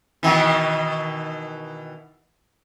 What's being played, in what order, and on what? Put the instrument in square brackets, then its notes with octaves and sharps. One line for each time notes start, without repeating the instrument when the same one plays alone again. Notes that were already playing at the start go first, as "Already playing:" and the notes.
[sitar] B2 D#3 E3